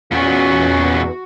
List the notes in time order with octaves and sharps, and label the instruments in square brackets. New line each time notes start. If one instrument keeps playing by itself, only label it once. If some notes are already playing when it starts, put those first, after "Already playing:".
[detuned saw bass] E2 [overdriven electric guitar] A#2 B3 [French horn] C#4 [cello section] F#4